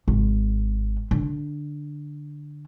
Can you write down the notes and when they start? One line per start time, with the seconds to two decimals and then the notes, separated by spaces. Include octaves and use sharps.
0.08 G#1
1.11 D3